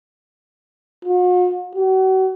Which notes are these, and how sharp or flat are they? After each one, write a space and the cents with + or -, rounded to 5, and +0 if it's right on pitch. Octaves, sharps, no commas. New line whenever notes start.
F#4 -45
F#4 +40